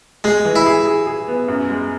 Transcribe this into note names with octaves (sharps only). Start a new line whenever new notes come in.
G#3 G#4
E3
E4
G#4
G#4
G#4
B3
F#2
G#3